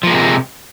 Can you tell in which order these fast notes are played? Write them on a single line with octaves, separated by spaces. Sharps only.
F3 A#3 G#3 C3